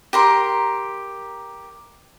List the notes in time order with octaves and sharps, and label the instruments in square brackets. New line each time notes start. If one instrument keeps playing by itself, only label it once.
[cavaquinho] G4 A#4 C6